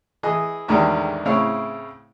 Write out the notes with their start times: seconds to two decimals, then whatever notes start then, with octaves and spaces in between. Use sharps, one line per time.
0.23 E3 G#4 D#5
0.68 A1 E2 G#2 D3 D#3 G3
1.25 A2 C#3 C4 E4 C#5 F5